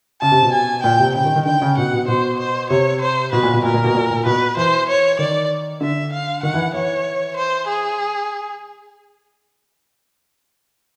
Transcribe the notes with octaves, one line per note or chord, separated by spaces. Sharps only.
C#3 A5
C3
B2
G#5
A#2 G5
C3
C#3 G5
D#3
D#3
D3 G5
C#3
B2 F#5
B2
B2 C5
C5
C3 C#5
C5
B2 B4
A#2
B2
A#2 A#4
A#2
B2
A#2
A#2
B2 B4
E3 C5
C#5
D#3 D5
D3 E5
F5
D#3 F#5
E3
E3 C#5
C5
G#4